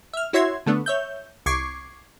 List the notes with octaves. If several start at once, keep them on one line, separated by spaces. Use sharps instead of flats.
E5 F6
E4 F#4 C#5 E5 C6 G#6
D3 A3 B3 D4
C#5 E5 G6
C2 C#6 D6 G#6 C7